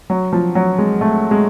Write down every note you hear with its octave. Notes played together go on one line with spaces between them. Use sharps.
F#3
F3
F#3
G#3
A3
G#3